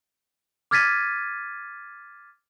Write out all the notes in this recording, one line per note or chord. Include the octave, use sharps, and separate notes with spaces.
D6 F6 G#6 A6 B6 D#7